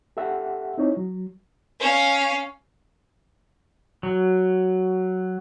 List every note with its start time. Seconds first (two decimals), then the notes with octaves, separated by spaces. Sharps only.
0.17 G4 A4 E5 F#5
0.78 C4 D#4 E4 C#5
0.97 F#3
1.80 C#4 F5
4.03 F#3